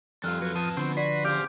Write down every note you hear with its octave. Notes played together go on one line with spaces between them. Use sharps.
F2 G3 F4 A4 F6 F#6
F#3 A4 B4
F3 B4 A5 D#6
D3 F3 B3 C4 F#4
F#4 B4 D5 C6
E2 C#3 G4 C5 F5 D6 G6 D7